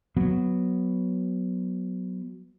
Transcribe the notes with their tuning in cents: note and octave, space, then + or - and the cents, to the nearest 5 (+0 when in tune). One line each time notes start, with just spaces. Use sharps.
F#3 +0 B3 +0